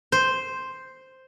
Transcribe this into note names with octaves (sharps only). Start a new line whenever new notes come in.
C5